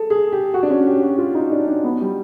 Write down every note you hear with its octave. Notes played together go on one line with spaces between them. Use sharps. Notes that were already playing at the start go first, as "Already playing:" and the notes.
Already playing: G#4 A4
G#4
G4
F#4
D4
C#4
G4
F#4
F4
D#4
D4
D4
B3
G3